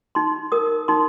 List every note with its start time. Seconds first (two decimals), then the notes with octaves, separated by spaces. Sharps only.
0.15 D#4 C6
0.52 A#4 D#6
0.88 D#4 C6